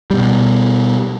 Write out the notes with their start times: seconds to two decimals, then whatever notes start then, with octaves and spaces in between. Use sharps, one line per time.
0.11 B2 G3